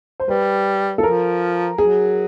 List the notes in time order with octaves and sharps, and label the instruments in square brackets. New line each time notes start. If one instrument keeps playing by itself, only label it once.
[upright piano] C5
[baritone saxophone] G3 [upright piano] B4
[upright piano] A4
[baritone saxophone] F3 [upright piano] A#4
[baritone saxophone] F#3 [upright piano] G#4